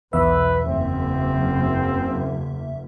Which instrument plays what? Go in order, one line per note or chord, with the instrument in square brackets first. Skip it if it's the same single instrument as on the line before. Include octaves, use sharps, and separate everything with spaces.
[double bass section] B1 [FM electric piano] E2 E5 [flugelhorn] B4
[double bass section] F#1 [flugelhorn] C4